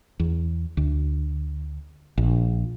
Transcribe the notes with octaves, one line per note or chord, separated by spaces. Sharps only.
E2
D2
A#1